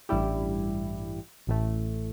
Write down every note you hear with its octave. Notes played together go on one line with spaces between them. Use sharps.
A1 G2 G3 E4 G4
A1 A2 A3